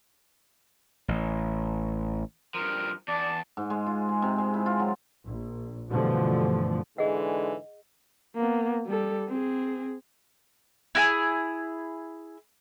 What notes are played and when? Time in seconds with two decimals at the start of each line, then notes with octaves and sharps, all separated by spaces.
1.08 A1
2.54 G2 F3 A#4
3.08 E2 D5 A5
3.57 G#2
3.70 G#3
3.86 F4
4.09 G#4
4.22 C3
4.38 G#3
4.54 E4
4.66 F4
4.80 F#3
5.24 A#1
5.89 G2 B2 D3 E3 F3 A3
6.98 G#2 D3 E3 G#3 G#4 D#5 F#5
8.36 A#3 B3
8.87 G3 A4
9.28 C4 G#4
10.95 E4 F#4 G#4